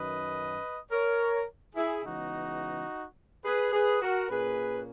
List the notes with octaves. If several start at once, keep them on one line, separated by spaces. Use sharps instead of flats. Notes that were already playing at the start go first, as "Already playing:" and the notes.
Already playing: F#2 D#3 F#3 C#4 B4 D#5
A#4 C#5
E4 G#4
C#3 E3 G#3 B3 D#4 F#4
G#4 B4
G#4 B4
F#4 A#4
A#2 A#3 C#4 G#4 B4